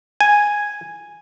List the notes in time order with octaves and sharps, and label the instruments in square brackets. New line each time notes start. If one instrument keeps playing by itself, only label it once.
[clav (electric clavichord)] G#5